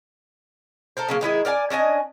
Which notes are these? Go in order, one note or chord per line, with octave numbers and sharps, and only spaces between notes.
A4 A#4 C5
C#3 F#3 A#3
D#3 G#3 E4 G#4
A#4 D5 F5 G#5
C#4 D4 D#5 G#5